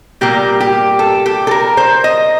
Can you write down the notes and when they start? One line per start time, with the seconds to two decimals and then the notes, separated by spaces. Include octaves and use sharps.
0.21 A#2 G3 A#3 G4
0.61 G4
0.99 A4
1.26 G4
1.47 A4
1.51 A#4
1.77 C5
2.04 D#5